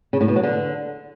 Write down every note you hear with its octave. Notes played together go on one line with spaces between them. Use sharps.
C#3
A2
B2
F#3
D3